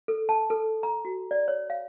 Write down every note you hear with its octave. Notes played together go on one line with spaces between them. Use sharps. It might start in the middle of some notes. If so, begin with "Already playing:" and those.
A4
A5
A4
A#5
F#4
D5
C#5
F5